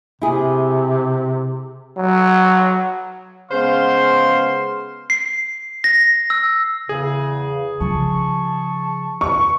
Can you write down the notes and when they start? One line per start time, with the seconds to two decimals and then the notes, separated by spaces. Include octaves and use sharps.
0.22 C3 E4 G#4
1.97 F#3
3.51 C#3 G#3 B3 C5 F5 C6
5.10 C7
5.84 A#6
6.30 E6
6.89 E2 C#3 G#4
7.80 C#3 F3 A5 C#6
9.21 C#6